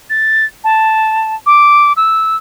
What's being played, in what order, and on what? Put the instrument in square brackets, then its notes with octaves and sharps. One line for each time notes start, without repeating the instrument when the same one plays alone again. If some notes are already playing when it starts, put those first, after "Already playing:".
[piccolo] A6
A5
D6
E6